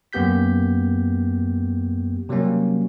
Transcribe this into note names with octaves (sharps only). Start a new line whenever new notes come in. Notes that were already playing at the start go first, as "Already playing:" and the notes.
F#2 A#3 B3 G4 G6 B6
C3 F#3 G3 A#3 C#4